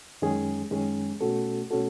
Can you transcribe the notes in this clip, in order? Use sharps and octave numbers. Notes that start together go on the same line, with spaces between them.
F#2 D#3 G#3 C#4 G#4
F#2 D#3 G#3 C#4 G#4
B2 A3 C#4 F#4 A4
B2 A3 C#4 F#4 A4